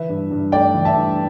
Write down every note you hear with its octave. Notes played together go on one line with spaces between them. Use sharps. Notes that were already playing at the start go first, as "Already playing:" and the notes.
Already playing: E3 B4 E5
G2
G2
A3 D5 G5
E3
E5 A5
G2